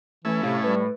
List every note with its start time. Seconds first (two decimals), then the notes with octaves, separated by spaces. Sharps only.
0.25 E3 A3 C#4 E4 A4
0.43 A2 C3 F5
0.63 G3 B4